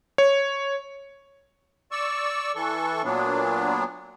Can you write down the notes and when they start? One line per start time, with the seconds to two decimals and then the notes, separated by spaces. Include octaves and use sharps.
0.18 C#5
1.92 D5 C#6 E6
2.55 E3 A4 C#6
3.04 A#2 F#3 B3 D4